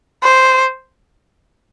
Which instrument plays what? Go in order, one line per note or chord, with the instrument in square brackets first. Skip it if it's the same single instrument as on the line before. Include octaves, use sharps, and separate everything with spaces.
[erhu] C5